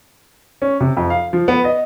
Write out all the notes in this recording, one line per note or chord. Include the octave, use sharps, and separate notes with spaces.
C#4
C3
F2
F5
F3
B3
D#5